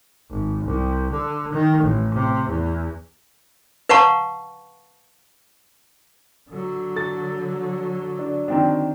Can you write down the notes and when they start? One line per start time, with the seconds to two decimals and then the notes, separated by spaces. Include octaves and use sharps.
0.31 G#1
0.65 C2
1.12 D3
1.53 D#3
1.84 A1
2.14 C3
2.49 E2
3.89 B4 F5 F#5 A5 A#5 C#6
6.50 D3 F#3
6.96 A4 A6
8.19 D4
8.48 D#3 C4 D4